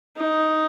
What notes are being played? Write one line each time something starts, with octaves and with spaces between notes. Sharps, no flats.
D#4